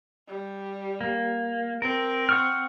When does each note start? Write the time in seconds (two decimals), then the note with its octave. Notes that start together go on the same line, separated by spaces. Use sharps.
0.28 G3
1.01 A#3
1.82 C4 A#4
2.29 F#5 C#6 F6